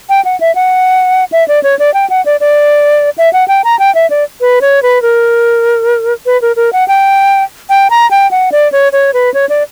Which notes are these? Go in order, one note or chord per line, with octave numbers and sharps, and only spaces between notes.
G5
F#5
E5
F#5
E5
D5
C#5
D5
G5
F#5
D5
D5
E5
F#5
G5
A#5
G5
E5
D5
B4
C#5
B4
A#4
B4
A#4
A#4
F#5
G5
G5
A#5
G5
F#5
D5
C#5
C#5
B4
C#5
D5